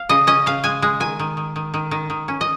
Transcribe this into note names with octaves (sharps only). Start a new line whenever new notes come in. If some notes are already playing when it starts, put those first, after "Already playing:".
Already playing: F5
C#3 D#5
C#4 D#5
C#3 F5
G#3 G#5
G#3
D#3 G#5
D#3
D#3
D#3
D#3
D#3
D#3
C#4
D#5